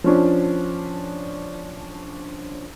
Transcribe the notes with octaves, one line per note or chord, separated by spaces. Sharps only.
F3 C#4 D4